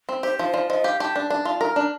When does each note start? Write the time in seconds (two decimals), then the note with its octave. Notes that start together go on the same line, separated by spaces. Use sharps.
0.09 C4
0.23 G4 C5
0.38 F3 C5
0.54 F3 D5
0.70 F3 D#5
0.84 G4 F5
1.00 G4 A5
1.16 D4
1.30 D4
1.45 F4
1.60 A#4 A#5
1.76 D4